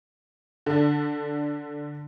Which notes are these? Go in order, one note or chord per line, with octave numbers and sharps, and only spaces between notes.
D3 D4